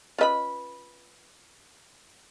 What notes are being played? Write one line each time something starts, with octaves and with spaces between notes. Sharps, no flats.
C#4 F4 B4 D#5 B5